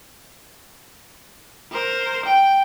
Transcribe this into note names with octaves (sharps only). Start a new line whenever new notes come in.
A#4 C5
G5